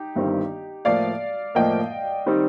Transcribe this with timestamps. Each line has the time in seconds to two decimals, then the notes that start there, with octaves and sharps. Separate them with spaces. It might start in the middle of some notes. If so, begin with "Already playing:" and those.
Already playing: D#4 G4
0.15 G1 G2 D#3 G3 C4
0.85 A2 F3 A#3 D5 F5
1.55 A2 F3 A#3 D#5 G5
2.26 D#3 G3 C4 D#4